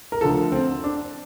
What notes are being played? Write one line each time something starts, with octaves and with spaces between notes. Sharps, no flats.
A#4
D2 D3 F3 A4
C4
D4